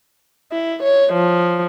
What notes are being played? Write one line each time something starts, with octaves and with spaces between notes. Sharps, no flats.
E4
C#5
F3